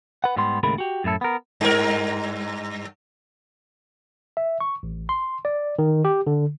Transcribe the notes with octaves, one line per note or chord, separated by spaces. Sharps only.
B4 F#5
G#2 G3 B3 C6
D#2 A2 C#3 G#3 A#4 B5
F#4 G4
F#2 A2 E4 A4
B3 A#4
G2 A#4
E5
C#6
A1
C6
D5
D#3
G4
D3